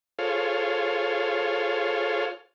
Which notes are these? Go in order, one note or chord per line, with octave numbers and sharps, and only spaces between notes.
F4 G#4 A4 C5 C#5 F5